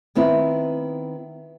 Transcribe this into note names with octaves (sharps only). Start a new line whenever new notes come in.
D#3 B3 C4 E4